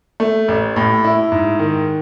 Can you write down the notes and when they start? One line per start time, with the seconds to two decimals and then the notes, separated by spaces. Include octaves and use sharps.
0.20 A3
0.48 A1
0.76 A2
1.04 E4
1.32 G#2
1.59 D#3